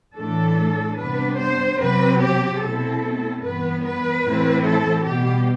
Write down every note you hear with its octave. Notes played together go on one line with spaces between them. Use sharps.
A2 E3 A3 D4 A4
C3 G3 B3 D4 B4
C5
C3 F#3 C4 B4
G4
B2 A3 C4 E4 A4
G2 E3 B3 B4
B4
A2 E3 A3 C4 E4
A4
B2 G3 B3 G4